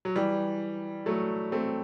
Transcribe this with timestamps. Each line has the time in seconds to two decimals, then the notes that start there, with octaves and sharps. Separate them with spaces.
0.05 F#3
0.15 E3 G3
1.06 F#3 A3
1.52 A3 C4